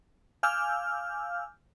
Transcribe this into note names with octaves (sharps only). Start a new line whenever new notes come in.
F5 G#5 D6 E6 F6 G6